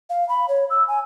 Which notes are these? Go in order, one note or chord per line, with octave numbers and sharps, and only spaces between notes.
F5
B5
C#5
E6
G#5